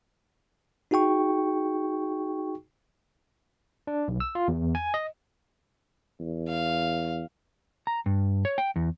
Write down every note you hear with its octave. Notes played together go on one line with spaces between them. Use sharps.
D#4 F#4 G#4 G5 C#6
D4
B1
E6
F4
E2
G#5
D#5
E2
F5
A#5
G2
C#5
G5
E2